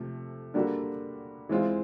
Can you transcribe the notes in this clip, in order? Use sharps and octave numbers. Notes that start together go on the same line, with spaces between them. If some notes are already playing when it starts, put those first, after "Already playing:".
Already playing: C3 F3 A3
D3 G3 A#3 D4 F#4
E3 G#3 C4 F4 G#4